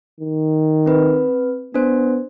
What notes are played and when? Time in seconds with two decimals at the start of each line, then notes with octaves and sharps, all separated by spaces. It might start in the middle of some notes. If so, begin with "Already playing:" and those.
0.20 D#3
0.86 C4 B4
1.74 B3 D4 C5